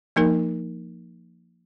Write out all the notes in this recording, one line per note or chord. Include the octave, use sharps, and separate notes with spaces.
F3 A#3 D#4 A#4